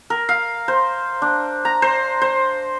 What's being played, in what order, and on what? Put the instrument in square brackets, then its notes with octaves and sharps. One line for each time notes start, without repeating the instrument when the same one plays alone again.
[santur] A#4
F5
C5
D4
A#5
C5
C5